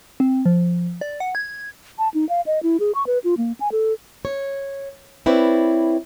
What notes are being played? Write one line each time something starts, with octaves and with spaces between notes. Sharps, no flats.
C4
F3
D5
F#5
G#6
A5
D#4
F5
D#5
E4
G#4
C#6
B4
F4
A#3
G#5
A4
C#5
C4 E4 B4 C#5 D5